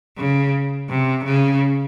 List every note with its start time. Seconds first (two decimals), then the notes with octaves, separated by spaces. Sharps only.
0.17 C#3
0.89 C3
1.24 C#3